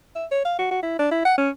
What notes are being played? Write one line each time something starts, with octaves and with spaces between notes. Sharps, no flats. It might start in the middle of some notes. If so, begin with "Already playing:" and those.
E5
C#5
F5
F#4
F#4
E4
D4
E4
F#5
C#4